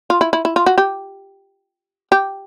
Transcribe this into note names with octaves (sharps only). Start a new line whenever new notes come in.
F4
E4
E4
E4
F4
F#4
G4
G4